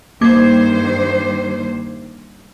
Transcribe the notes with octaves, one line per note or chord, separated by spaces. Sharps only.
G2 D#3 A#3 C5 D6 G#6